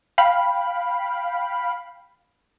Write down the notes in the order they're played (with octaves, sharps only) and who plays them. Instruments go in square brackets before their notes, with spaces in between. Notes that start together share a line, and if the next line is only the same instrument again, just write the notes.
[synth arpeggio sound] F5 G5 B5